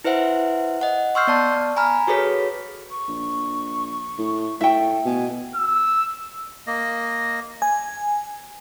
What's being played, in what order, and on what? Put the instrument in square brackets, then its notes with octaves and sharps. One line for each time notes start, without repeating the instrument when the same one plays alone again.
[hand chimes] E4 B4 C5 E5 F#5
D#5 F#5
C6 C#6 E6 F6 G6 C7
B3 D5 A5
G#5 A#5 B5 F6
F#4 G#4 A4 B4 C#5 B6
[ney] C#6
[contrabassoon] A#1
A2
[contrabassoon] A2 [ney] A4 [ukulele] E5 G5
[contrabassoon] B2 [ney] G#5
[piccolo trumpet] E6
[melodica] A#3 D#5
[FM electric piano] G#5